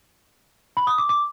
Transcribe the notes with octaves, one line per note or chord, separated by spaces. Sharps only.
B5
D#6
D6
D6